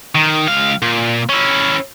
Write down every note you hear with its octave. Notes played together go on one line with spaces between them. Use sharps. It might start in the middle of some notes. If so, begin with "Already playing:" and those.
D#3
C#2 F5
A#2
C#4 E4